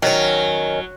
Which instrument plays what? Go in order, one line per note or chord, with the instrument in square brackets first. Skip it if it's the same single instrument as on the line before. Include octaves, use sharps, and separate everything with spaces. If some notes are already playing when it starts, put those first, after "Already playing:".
[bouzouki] D#3 C#4 [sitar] F#3